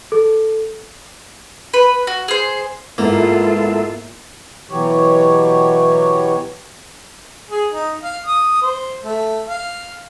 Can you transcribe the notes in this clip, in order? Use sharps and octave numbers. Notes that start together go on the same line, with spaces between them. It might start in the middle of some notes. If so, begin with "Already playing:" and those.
A4
B4
F#4
G#4 C5
G#2 A#3 B3 E4 F4 A4 E5
B2 E3 F#3 G4 C#5
G#4
D#4
F5
D#6
C5
A3
F5